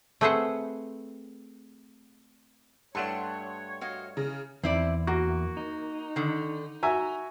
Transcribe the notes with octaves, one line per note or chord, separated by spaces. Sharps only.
A3 C4 G#4 B4 C5 F#5
G2 A3 D4 A4 C#5 F#5 G5 C6
F#4 D#5 F5
C#3 A#5
E2 C4 E4 D5
A#3 F#4
D#4
D3 D#3
F#4 E5 G#5 A#5